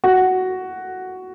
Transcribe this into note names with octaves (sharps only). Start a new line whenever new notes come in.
F#4